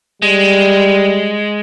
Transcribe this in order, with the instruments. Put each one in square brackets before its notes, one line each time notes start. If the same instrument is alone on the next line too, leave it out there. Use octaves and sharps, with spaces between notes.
[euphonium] G3 [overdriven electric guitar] G#3